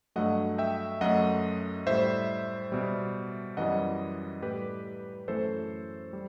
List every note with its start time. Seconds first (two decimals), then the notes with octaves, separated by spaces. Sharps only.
0.16 G2 F#3 A3 D#5 F#5
0.58 E5 G5
1.01 F#2 F#3 A3 D#5 F#5
1.87 A2 G3 C5 E5
2.72 B2 G3
3.57 F#2 E3 G3 D#5 F#5
4.42 A2 G3 G4 B4
5.28 F#2 E3 A3 A4 C5
6.13 G3